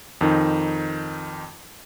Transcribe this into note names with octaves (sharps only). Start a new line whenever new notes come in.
F2 D#3 D#4